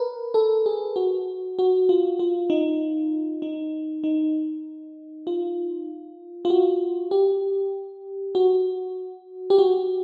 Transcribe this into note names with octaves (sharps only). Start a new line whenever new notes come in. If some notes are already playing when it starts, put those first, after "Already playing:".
Already playing: A#4 B4
A4
G#4
F#4
F#4
F4
F4
D#4
D#4
D#4
F4
F4
F#4
G4
F#4
G4
F#4